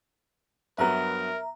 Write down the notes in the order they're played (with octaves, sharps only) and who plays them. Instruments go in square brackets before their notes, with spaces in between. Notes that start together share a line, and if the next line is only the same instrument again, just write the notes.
[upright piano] G2 F#3 B3 [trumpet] A#4 [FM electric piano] E5 A#5